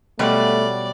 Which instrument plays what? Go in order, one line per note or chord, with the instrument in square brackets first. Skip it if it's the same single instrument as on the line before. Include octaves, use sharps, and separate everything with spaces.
[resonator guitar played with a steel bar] B2 F#3 G3 [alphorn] A3 [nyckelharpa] D5